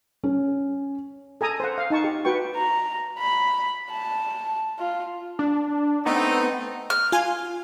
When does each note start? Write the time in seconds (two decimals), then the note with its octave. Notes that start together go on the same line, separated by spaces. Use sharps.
0.24 C#4
1.41 A4 G#5 A#5 D#6
1.60 C5 F#5
1.78 F5
1.90 D#4 A5 C#6
2.04 G4
2.25 F#4 B4 G5 C#6
2.56 A#5
3.18 B5
3.91 A5
4.79 F4
5.39 D4
6.06 A3 B3 C4 D#4
6.90 F6
7.12 F4 G#5